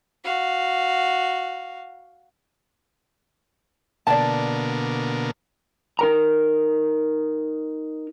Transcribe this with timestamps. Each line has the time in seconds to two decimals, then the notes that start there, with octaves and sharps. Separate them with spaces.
0.24 F#4 F5
4.07 B2 D3 A#3 D5 A5
5.99 D#4 A#4 A#5